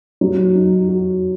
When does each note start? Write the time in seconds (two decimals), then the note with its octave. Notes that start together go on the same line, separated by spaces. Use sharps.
0.21 F#3
0.55 D#4
0.89 F#4